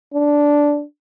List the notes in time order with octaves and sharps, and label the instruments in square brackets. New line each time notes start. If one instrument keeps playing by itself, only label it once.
[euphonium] D4